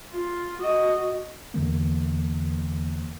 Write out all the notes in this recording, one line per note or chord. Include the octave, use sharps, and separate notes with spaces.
F4
F#4 D#5
E2 D3 E3 A#3